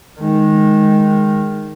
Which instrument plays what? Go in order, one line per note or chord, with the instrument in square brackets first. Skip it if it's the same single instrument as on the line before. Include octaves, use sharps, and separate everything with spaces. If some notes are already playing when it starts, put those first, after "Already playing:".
[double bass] D#3 G#3